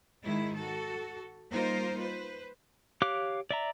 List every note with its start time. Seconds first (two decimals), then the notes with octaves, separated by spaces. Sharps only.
0.23 G#2 D#3 G#3 E4
0.56 F#4 A4
1.51 G3 A#3 D#4 F4 A#4 C5
1.99 B4 C5
3.02 G4 C#5 F5 D6 F#6
3.51 D5 E5 A#5